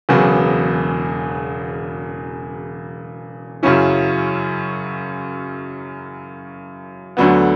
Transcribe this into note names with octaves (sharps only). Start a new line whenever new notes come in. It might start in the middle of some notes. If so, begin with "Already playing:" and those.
E1 E2 C#3 F#3 B3
F#2 C#3 F#3 C#4 E4
D2 D3 F#3 B3